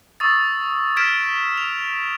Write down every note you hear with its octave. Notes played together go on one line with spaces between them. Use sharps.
C#6 D#6 E6 A6
F6 G#6 B6 D7 E7
F7